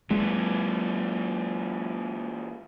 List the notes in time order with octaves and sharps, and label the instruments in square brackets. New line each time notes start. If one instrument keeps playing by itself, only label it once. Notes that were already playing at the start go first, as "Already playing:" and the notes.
[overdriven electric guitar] A#2 E3 [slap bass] F#3 C4 [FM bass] G#3